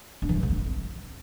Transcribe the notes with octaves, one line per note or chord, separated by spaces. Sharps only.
D4
E3
G3
D3
C4